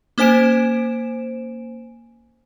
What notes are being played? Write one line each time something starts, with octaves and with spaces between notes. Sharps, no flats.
A#3 C#4 C5 G#5 D7 E7